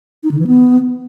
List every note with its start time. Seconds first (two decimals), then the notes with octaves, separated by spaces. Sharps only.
0.24 D#4
0.31 D3
0.39 E3
0.47 B3